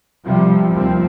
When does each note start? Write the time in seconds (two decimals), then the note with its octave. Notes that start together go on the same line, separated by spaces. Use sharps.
0.25 C3 F3 G3
0.71 D#2 F3 C4